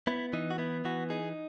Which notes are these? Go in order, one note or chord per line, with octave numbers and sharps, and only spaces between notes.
B3 E4
E3 D#4
F#4
B3 E4
E3 F#4
D#4 G#4